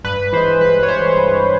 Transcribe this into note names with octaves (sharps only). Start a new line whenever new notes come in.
G2 B4
E3 G#3 C5
G2 B4
C#5
E3 G#3 C5
G2